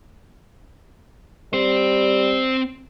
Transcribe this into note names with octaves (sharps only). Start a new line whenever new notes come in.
G3 C4 C5